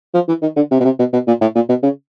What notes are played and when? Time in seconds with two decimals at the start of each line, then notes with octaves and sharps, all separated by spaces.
0.14 F3
0.28 E3
0.42 D#3
0.56 D3
0.71 C3
0.80 B2
0.85 C3
0.99 B2
1.13 B2
1.28 A#2
1.41 A2
1.55 A#2
1.69 B2
1.83 C#3